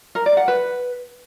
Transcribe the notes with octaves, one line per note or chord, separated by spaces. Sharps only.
A#4
D5
F#5
B4